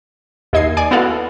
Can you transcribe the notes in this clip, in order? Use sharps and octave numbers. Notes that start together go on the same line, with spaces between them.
D#2 E4 D#5 G#6 C7
D5 G#5 D6
B3 E4 F#4 A4 F5 F#5